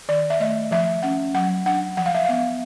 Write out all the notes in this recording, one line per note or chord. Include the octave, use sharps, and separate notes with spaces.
D#3 D5
E5
A3 D#5
F3 E5
C#4 F#5
F#3 F#5
D4 F#5
F3 F#5
F5
E5
B3 F5